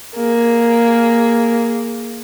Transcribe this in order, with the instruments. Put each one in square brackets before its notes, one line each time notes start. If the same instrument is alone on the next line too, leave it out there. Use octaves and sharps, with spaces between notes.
[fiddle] A#3 G#4